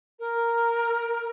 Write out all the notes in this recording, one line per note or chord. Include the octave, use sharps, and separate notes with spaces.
A#4